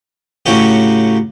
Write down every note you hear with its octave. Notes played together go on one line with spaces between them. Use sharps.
A2 C#3 F#3 C#4 G4